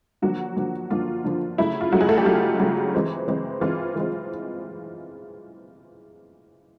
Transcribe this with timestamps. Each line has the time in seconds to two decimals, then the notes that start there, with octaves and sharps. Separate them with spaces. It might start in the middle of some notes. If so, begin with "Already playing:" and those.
0.22 D3 F3 F#3 A#3 F#4
0.56 D3 F3 A#3
0.90 D3 F3 A#3 F4
1.24 D3 F3 A#3
1.58 C#3 F#3 A3 E4
1.81 F4
1.92 C#3 F#3 A3 F#4
2.00 G#3 G#4
2.09 A3 A4
2.17 G3 G4
2.26 C#3 F#3 A3 F4
2.59 C#3 F#3 A3
2.94 E3 G#3 C4
3.28 E3 G#3 C4
3.61 E3 G#3 C4 F4
3.96 E3 G#3 C4